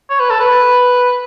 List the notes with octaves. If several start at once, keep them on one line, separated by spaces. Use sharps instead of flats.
C#5
B4
A4
B4